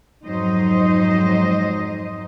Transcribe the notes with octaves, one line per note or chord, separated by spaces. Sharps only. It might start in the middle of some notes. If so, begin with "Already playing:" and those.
F2 G#2 F#3 D#4 C5 D#5